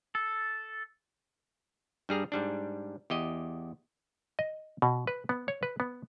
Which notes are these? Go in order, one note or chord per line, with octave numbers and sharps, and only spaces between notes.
A4
G2 G3 G#4 A#5
G#2 G3 D4
E2 G4 D#5
D#5
B2
B4
B3
C#5
B4
B3